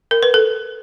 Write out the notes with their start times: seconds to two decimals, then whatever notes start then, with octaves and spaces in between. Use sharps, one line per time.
0.11 A#4
0.23 B4
0.34 A4